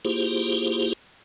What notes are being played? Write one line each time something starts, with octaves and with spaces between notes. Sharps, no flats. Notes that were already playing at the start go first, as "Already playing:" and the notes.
A#3 E4 F4 G4 G#4 C5